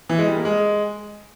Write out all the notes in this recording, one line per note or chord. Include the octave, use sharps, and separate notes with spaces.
E3
G#3
G3
A#3
G#3